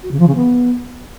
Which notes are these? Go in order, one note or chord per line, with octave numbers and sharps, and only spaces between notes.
F#4
C#3
F3
C#3
B3